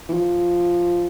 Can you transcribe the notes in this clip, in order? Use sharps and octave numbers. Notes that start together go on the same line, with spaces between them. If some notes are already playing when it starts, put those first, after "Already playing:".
E3
F3